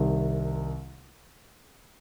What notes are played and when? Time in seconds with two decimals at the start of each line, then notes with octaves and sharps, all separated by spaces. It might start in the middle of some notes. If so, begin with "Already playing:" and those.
Already playing: C2 C3 D#3